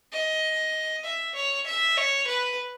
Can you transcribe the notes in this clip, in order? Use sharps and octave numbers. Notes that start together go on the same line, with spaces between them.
D#5
E5
C#5
E5
C#5
B4